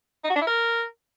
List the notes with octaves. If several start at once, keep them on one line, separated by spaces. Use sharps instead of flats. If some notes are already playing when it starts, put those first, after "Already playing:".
D#4
F#4
D4
E4
A#4